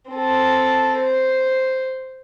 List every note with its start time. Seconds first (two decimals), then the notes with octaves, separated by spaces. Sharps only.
0.11 C4 A4
0.99 C5